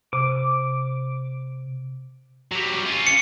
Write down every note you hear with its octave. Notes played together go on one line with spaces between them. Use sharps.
C3 D6
F#3 G3
C#4 F4
C#7